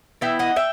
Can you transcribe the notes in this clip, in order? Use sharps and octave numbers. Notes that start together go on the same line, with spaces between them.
E3 B3 E4 E5 G5
D#5 F#5
E5 G5